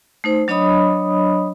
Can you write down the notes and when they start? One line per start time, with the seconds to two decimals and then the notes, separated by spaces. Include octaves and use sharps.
0.24 A3 D#4 C5
0.48 F#3 D4 C#5 D#5 B5 D#6